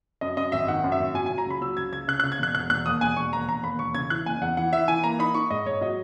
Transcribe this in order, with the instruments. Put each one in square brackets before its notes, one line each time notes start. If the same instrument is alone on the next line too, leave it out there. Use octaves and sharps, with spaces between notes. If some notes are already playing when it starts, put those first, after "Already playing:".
[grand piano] F#2 D#5
F#2 D#5
G#1 E5
D#3 F#5
F#2
E5
G#1
F#3 G#5
F#3 G#5
A#5
C#2 B5
F#3 E6
C#2 G#6
C#2 G#6
C#3 F#6
C#3 F#6
G#6
E1 F#6
E1 F#6
E1 F#6
D#2 D#6
E1 G#5
E1 C#6
D#2 A#5
E1 A#5
D#2 B5
E1 C#6
C#3 G#6
E3 F#6
F#1 G#5
E2 F#5
E3 F#5
E3 E5
E3 G#5
A#3 A#5
D#4 B5
D#4 C#6
G#2 D#5
G#2 C#5
F#3 D#5